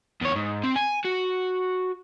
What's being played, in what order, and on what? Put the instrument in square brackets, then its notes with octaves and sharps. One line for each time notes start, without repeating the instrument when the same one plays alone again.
[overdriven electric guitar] E2 C#5
G#2
C4
G#5
F#4